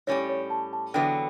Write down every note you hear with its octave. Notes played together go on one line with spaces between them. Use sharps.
A2 G3 C#4 G4 C#5
C#5
A5
A5
E2 D3 F#3 B3 G5